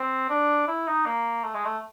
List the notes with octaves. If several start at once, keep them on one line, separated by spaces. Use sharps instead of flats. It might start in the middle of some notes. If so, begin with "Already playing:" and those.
Already playing: C4
D4
E4
D#4
A#3
A3
G#3
A3